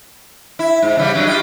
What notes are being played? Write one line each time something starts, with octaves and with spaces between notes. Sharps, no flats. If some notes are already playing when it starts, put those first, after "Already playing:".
E4
G#2
C#3 E3 G3
G2 F#3 C#4
F4 G4 D#5